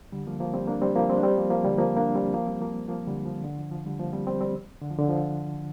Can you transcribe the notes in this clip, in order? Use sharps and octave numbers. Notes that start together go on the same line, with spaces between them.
D3 G3
F3 A#3
F3 A#3
G3 C4
A#3 D4
G3 C4
F3 A#3
G3 C4
D4
G3 C4
F3 A#3
F3 A#3
D3 G3
F3 A#3
A#3 D4
G3 C4
F3 A#3
G3 C4
F3 A#3
F3 A#3
D3 G3
F3
D3
F3
F3
D3 G3
F3 A#3
G3 C4
G3 C4
G3 C4
D3
F3
D3
F3